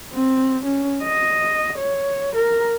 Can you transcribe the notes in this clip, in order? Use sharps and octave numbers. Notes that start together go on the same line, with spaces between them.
C4
C#4
D#5
C#5
A#4